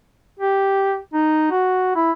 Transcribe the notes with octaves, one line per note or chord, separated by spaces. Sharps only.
G4
D#4
F#4
E4